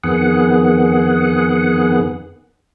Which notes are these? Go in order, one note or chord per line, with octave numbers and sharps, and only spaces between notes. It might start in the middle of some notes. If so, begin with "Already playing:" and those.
F2 D#3 B3 G#4 F#5